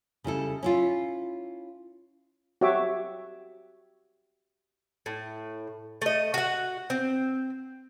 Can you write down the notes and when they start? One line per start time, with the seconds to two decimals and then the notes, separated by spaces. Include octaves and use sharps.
0.24 C#3 G3 E4 A4
0.63 C#4 E4 F4
2.61 F#4 G4 C#5 E5 D6
5.06 A2
6.02 A3 D#5
6.34 F#4 F#5
6.90 C4